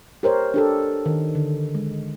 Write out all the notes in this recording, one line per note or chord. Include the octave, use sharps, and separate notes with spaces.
G4 A#4 C5 C#5
D4 G4 A4
D#3
D3
G#3